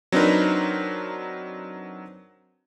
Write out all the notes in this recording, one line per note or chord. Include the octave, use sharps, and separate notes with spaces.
F#3 C4 D4 D#4 A#4 B4